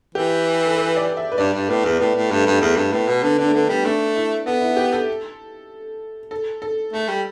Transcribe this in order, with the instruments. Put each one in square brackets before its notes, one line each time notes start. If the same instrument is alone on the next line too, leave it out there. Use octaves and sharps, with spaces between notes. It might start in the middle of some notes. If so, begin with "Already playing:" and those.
[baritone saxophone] E3 [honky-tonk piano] G4
[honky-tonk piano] A4
B4
D5
E5
B4
[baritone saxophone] G2 [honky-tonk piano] D5
[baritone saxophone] G2
[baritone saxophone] A2 [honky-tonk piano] B3
[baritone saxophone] E2
[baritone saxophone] A2 [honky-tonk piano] B3
[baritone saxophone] A2
[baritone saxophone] G2 [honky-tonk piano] A3
[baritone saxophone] G2 [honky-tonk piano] A3
[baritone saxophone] E2 [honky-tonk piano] A3
[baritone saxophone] G2
[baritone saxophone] A2 [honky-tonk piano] B3
[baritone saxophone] B2
[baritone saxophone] D3 [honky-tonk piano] B3
[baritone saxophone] D3 [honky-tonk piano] D4
[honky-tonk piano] A3
[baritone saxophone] D3 [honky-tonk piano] B3
[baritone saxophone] G3 [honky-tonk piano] B3
[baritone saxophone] A3 [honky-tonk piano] D4
[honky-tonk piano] E4
[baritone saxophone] B3 [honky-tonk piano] A4
[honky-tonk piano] E4
G4
A4
A4
A4
[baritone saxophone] A3 [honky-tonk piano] A4
[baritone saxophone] G3